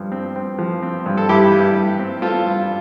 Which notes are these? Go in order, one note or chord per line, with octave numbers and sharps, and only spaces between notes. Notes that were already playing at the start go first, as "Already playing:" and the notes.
Already playing: G2 F3
C4
C4
F3
C4
G2
A4
G2 E4 G4
G2
G2
C4
C4 F4 A4
G2